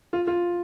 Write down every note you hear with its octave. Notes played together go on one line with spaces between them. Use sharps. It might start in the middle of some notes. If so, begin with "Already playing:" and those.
F4
F4